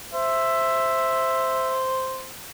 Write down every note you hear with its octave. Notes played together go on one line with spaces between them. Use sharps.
C5 E5